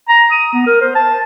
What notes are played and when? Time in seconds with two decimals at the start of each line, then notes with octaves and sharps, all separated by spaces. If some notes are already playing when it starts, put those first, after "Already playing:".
0.09 A#5
0.32 D#6
0.53 B3
0.67 A#4
0.81 C5
0.95 A5